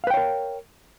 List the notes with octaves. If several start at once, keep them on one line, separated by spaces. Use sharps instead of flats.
A#4 B4 C#5 F5 G5